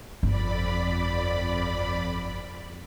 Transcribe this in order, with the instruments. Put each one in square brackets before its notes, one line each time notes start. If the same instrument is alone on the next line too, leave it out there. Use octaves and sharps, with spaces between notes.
[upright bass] G1 [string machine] F2 D5 B5